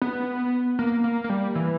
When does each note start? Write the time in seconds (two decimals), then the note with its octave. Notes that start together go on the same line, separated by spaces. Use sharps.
0.02 B3
0.79 A#3
1.04 A#3
1.24 A#3
1.29 G3
1.55 E3